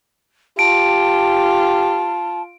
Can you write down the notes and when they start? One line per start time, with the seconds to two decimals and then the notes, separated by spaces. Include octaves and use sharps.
0.59 F4 G4 A5 D7